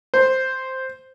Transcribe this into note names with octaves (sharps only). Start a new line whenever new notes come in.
C5